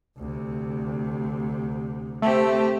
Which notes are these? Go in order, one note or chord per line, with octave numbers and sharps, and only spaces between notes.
D2 C3
A3 C4 G4